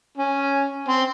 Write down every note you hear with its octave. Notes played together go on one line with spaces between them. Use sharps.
C#4
C4